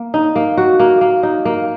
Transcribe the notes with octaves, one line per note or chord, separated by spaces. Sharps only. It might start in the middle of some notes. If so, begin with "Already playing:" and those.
Already playing: A#3
D#4
A#3
F#4
A#3
A#3
D#4
A#3